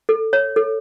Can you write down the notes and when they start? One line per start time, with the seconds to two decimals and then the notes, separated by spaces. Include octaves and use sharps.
0.09 A4
0.33 C#5
0.56 A4